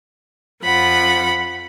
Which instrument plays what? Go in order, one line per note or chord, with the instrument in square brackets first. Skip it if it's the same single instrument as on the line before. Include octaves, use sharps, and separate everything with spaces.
[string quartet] F2 F3 F#5 B5